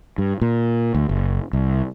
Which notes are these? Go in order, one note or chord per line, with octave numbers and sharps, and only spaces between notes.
G2
A#2
D2
F#1
C2